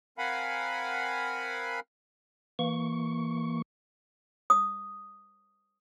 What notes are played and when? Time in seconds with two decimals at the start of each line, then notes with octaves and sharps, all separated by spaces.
0.18 C4 A#4 F5 F#5 G#5 B5
2.59 E3 A#3 C#6
4.50 D#6